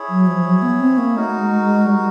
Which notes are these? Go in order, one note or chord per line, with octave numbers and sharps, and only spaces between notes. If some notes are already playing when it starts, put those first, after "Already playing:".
Already playing: E4 G#4 C#5
F#3
F3
F#3
B3
C4
A#3
A3 D#4 F#4 A#4
A3
G#3
G#3
G3